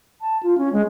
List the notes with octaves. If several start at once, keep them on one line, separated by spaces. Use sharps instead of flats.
A5
F4
C#4
G#3